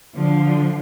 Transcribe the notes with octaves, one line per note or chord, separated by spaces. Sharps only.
D3 F3